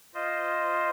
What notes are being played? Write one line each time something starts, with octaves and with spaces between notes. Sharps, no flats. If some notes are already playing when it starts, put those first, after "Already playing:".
F4 C5 D#5